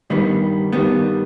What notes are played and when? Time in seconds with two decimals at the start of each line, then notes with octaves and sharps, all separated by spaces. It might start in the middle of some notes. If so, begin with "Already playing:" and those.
0.10 G2 D#3 G3 B3
0.72 G2 D#3 G3 B3